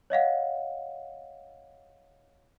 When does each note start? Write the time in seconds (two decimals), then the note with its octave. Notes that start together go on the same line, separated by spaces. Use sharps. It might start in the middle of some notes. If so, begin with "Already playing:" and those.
0.10 C#5 D#5 F5 F#5